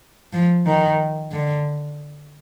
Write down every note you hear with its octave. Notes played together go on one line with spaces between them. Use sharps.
F3
D#3
D3